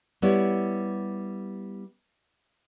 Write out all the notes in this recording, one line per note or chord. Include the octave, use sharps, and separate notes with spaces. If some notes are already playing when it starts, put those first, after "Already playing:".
G3 B3 E4 C#5